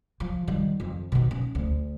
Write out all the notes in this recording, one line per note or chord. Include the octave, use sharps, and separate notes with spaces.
F3
D#3 G3
F2
B2 D#3
C#4
D2